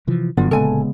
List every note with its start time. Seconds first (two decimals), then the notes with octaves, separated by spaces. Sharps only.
0.07 C3 E3 F3
0.37 F#1 G2 D3 F#3 B3 F4
0.51 D1 D2 A#2 C#3 G#3 B3 A4 G#5